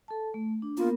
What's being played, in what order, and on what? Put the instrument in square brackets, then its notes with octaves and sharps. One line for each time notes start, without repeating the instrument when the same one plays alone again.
[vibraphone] A4 A5
A3
D4
[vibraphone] A#3 B3 A#4 [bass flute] F4